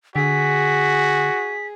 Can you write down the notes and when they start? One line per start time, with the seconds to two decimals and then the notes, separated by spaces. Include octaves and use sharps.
0.16 D3 F#4 G#4 B6